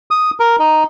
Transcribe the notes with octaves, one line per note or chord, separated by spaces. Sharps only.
D#6
A#4
D#4